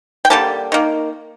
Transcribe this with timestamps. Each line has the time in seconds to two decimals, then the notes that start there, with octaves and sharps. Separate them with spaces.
0.25 G5
0.30 D3 G3 A#3 A5
0.72 D#3 A#3